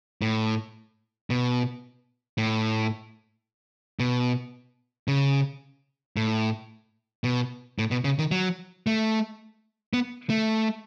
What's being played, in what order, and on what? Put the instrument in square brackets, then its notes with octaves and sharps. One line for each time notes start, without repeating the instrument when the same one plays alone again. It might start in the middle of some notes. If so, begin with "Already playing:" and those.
[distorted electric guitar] A2
B2
A2
B2
C#3
A2
B2
A2
B2
C#3
D#3
F#3
A3
B3
A3